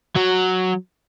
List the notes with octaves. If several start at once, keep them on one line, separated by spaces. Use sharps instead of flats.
F#3